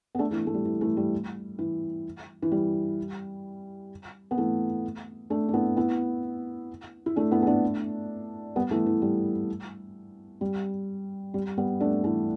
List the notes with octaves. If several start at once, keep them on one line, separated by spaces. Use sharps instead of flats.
B3
A3 D4
E3 A3
A3
G3
E3
E3 A3
G3
E3
E3
G3
B3
E3 A3
A3 D4
D4
B3 E4
B3 E4
E4
A3 D4
B3 E4
B3
A3 D4
G3 B3
E3 A3
E3
G3
G3
G3
G3 B3
A3 D4
E3 A3